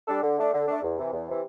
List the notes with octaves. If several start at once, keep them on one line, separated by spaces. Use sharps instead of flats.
G3 D4 A4
D3
A3 D4
D3
A3 D4
E2
C3 E3
E2
C3 E3